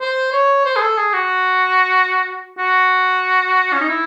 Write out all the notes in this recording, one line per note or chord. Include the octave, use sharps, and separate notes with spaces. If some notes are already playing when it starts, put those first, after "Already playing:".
C5
C#5
C5
G#4
A4
G#4
F#4
F#4
C#4
D#4
E4